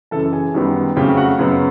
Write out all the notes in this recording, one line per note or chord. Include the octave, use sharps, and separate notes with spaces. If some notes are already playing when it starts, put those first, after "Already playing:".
F#2 C#3 E3 A4 A5
G#4 G#5
F#2 D#3 G3 B3
F2 C#3 F#3 A3 G4 G5
F#4 F#5
F#2 C#3 F#3 B3